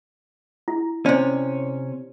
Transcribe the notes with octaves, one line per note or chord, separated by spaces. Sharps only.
E4
C3 C#4 C5 D5